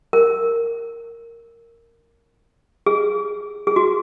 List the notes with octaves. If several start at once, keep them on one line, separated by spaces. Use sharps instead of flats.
A#4
G#4
G#4
F#4